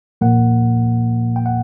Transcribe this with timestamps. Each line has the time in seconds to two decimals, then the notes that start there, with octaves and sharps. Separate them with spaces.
0.21 A#2 F3 A#3 F#5
1.36 G5
1.46 F#5